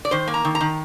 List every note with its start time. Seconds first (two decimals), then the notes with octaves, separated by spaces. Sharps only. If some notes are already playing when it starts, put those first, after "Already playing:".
0.05 D5
0.11 D#3 C5
0.28 A#3
0.34 A#5
0.45 D#3
0.55 A#5
0.61 D#3